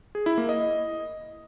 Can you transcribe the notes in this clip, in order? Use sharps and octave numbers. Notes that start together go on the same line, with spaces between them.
G#4
E4
A#3
D#5